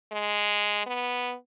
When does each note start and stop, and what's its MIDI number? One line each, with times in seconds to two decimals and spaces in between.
0.12 0.86 56
0.87 1.34 59